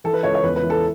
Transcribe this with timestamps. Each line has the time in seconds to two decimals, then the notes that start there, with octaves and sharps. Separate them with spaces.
0.04 E3 A4
0.13 B4
0.23 C#2 C#5
0.34 C#5
0.43 E2 B4
0.56 B4
0.63 E3
0.70 A4